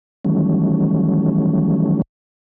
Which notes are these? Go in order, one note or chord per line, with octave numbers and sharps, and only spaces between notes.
D#3 E3 F#3 G3 A3 C#4